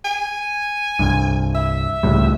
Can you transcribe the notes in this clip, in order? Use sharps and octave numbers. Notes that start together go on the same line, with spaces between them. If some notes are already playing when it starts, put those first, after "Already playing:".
G#5
C2 G2
E5
C#2 A2 G3